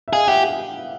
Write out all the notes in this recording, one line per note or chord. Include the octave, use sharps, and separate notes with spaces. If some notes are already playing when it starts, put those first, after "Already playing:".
E5
G#4 D#5 F5
G4 E5 F#5